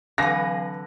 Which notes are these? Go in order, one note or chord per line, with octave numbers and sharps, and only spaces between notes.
D3 E3 F#3 C4 B4 F5 G#5 A#6